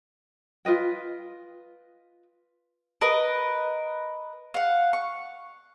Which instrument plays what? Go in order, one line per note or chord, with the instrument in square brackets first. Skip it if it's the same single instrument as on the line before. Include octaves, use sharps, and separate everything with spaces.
[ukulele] F4 B4 D#5 G5
[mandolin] A#4 B4 D#5
F5 F#5
C#6